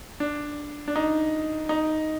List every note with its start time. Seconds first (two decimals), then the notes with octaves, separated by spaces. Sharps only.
0.20 D4
0.88 D4
0.96 D#4
1.69 D#4